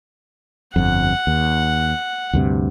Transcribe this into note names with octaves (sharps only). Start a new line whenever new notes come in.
G1 F2 F#5
D#2
D2 G2 C3